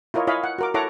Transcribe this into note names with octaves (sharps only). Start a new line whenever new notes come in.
E4 F4 A#4 C#5 D#5
E4 C#5 D#5 F5 G#5 B5
F#5
F#4 A#4 D6
E4 A4 C#5 F#5 A#5 D6